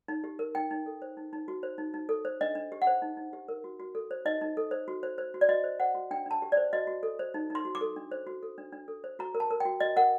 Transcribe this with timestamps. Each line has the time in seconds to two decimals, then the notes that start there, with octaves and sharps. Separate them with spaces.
0.08 D#4
0.24 G4
0.39 A#4
0.55 D#4 G5
0.71 D#4
0.86 A4
1.02 C5
1.17 D#4
1.33 D#4
1.48 F#4
1.63 C5
1.78 D#4
1.94 D#4
2.09 A4
2.25 C5
2.41 D4 D#5
2.55 D4
2.72 G4
2.82 F#5
2.87 C5
3.02 D#4
3.17 D#4
3.33 G4
3.48 A#4
3.64 F#4
3.80 F#4
3.95 A4
4.11 C5
4.25 D#4 D#5
4.41 D#4
4.57 A4
4.71 C5
4.88 F#4
5.03 C5
5.18 C5
5.34 F#4
5.41 D5
5.49 F#4 D#5
5.64 C5
5.80 C5 F#5
5.95 F#4
6.11 D4 G5
6.26 D4 A5
6.42 G4
6.52 D5
6.57 C5
6.73 F#4 D#5
6.87 F#4
7.03 A4
7.19 C5
7.34 D#4
7.50 D#4 C6
7.65 F#4
7.75 D6
7.81 A4
7.96 D4
8.12 C5
8.27 F#4
8.43 A4
8.58 D4
8.73 D4
8.88 A4
9.04 C5
9.19 F#4 A#5
9.35 A#4
9.40 A5
9.51 A#4
9.60 G5
9.65 F#4
9.80 F#4 D#5
9.96 A#4 F#5